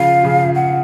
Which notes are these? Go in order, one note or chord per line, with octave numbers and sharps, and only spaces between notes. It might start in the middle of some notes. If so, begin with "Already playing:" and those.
Already playing: C#3 F3 F5
C#3 F3
F#5